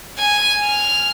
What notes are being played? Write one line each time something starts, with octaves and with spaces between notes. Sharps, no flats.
G#5
F6